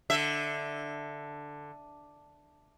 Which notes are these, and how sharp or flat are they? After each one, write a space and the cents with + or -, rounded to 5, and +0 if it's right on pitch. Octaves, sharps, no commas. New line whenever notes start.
D3 +0 E5 +0